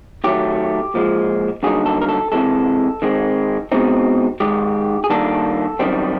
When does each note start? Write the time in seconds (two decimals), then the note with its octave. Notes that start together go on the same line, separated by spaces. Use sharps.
0.24 D#3 F#3 A3 G4
0.94 A#2 F3 G#3
1.63 G2 D3 F#3 A#3 D#4 G#4
1.86 A4
2.02 A#4
2.09 A4
2.32 C3 E3 G#3 A4
3.02 D#3 G#3 C4
3.72 B2 G#3 C4 D#4
4.40 G#2 D#3 G#3 G4
5.04 G#4
5.10 D#3 G3 A#3 D4 A4
5.79 F#2 D#3 G3 C4